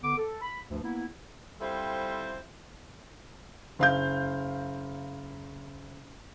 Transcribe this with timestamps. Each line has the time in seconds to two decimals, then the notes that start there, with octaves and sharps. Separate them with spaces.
0.03 D3 B3 D6
0.18 A4
0.42 B5
0.71 D2 G2 F3
0.83 A#3 B3 E4
1.60 G3 C4 E4 F4 A4 C5
3.79 F#1 F5 G6